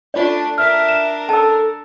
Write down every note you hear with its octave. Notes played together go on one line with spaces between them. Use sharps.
A3 D4 F4 D5
D4 A#4 E5 F6
E7
A4 A5 E6